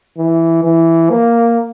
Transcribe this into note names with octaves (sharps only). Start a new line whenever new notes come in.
E3
E3
A#3